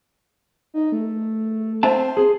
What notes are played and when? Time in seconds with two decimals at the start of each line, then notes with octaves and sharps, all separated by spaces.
0.74 D#4
0.92 A3
1.83 C4 C5 E5 A5
2.17 G#4